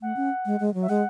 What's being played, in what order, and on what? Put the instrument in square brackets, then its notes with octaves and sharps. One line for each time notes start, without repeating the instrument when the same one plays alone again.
[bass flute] A3 [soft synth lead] F#5
[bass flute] C#4
G#3
G#3
F#3
[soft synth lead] E5
[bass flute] G#3 [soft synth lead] F#5